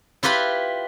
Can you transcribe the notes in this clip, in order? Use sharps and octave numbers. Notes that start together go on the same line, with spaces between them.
E4 F4 G4 B4 B5